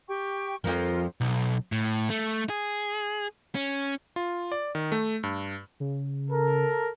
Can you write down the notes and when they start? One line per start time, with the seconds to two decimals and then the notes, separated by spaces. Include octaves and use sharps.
0.08 G4 G5 C#6
0.64 F2 F3 F4 A#4 F6
1.21 B1
1.72 A2
2.10 A3
2.50 G#4
3.55 C#4
4.16 F4
4.52 D5
4.75 D#3
4.92 A3
5.23 G2
5.80 C#3
6.31 A4 A#4